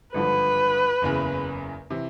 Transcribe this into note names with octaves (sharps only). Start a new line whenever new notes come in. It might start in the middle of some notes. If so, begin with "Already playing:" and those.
G#1 G2 D3 F3 B4
F#1 E2 C#3
C3 E3